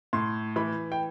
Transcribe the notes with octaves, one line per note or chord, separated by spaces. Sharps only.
A2 C6
E3 B5
G5